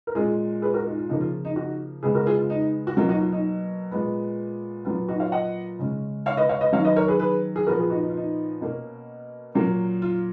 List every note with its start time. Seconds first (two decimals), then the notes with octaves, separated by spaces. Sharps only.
0.07 A#4
0.15 A#2 G#3 C#4 F4 G#4
0.62 G#4 B4
0.74 F#4 A#4
0.86 D#4
0.98 F4
1.09 C#3 F3 A#3 C#4 D#4
1.21 F4
1.45 D#4
1.56 D#4 F#4
2.03 C#3 G#3 B3 G#4 B4
2.15 F#4 A#4
2.26 F4 G#4
2.39 F4
2.50 D#4
2.87 F#4
2.97 B2 F#3 A#3 F4
3.09 D#4 F#4
3.20 F4
3.32 D#4
3.91 A#2 G#3 B3
4.85 A#2 F#3 B3 F4
5.08 D#4 F#4
5.20 C#5 F5
5.32 D#5 F#5
5.79 C#3 G#3 C#4
6.26 C#5 F5
6.37 B4 D#5
6.49 C#5 F5
6.61 B4 D#5
6.72 D#3 F#3 C#4 C#5 F5
6.84 B4 D#5
6.96 A#4 C#5
7.08 G#4 B4
7.20 G#4 B4
7.56 G#4
7.66 A#2 F3 B3 F#4 A#4
7.78 F4 G#4
7.90 D#4 F#4
8.02 D#4
8.09 F4
8.17 D#4
8.61 B2 A#3 C#4
9.55 A#2 F#3 A#3 C#4
10.02 F4